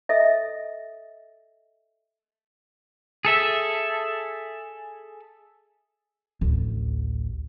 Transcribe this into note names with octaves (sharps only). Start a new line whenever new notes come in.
A4 D#5 E5
G#4 A4 E5
A1 D2